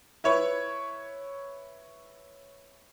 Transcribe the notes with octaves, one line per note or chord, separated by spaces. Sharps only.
E4 B4 C#5